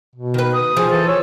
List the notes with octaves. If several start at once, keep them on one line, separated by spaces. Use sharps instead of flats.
B2
D#3 B4
D#6
F3 G#4
E3 A4
C#5 E6